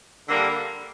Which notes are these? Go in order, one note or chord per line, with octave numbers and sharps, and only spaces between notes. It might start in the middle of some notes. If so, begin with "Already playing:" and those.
D3 G3 A#3